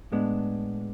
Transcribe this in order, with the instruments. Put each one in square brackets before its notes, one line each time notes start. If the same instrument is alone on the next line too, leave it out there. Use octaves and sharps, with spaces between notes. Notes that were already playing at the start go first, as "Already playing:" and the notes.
[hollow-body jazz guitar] A2 G#3 B3 D4